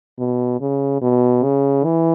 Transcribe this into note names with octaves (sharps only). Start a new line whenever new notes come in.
B2
C#3
B2
C#3
E3